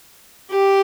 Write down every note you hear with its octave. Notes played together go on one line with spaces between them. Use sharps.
G4